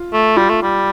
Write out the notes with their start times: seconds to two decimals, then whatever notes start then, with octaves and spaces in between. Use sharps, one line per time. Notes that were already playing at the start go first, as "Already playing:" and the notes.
Already playing: F4
0.13 A3
0.37 G3 F4
0.50 A3
0.63 G3